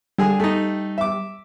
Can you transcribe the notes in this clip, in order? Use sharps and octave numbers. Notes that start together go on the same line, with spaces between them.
D3 G3 G#4 G#5
A3 D#4
E5 D6